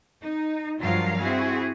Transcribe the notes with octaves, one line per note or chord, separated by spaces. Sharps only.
D#4
G2 F3 F#3 F4 A#4 F5
C4 E4 F#4 G#4